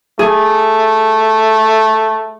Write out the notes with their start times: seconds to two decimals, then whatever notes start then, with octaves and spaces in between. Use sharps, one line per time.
0.19 A3 G#4